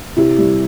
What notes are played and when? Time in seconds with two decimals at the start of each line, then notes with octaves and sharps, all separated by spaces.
0.17 C3 E4
0.38 G3